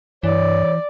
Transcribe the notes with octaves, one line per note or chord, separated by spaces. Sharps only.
G2 E3 C#5 D5